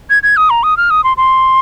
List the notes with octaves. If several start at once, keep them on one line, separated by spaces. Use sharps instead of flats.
G#6
G#6
D#6
A#5
D#6
F6
D#6
C6
C6